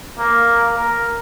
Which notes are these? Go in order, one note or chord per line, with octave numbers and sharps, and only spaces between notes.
A#3
A#4